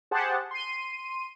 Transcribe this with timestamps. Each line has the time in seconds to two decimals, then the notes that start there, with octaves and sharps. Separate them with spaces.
0.11 G4 G#4 C5 F#5 A5
0.51 C6 D#7